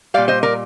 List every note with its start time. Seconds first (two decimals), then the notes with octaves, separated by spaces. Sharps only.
0.14 A#2 G3 D5 F5
0.28 C5 D#5
0.43 A#4 D5